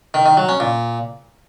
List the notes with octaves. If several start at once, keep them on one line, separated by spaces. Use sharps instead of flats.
D#3
D#3
F#3
C#4
A#2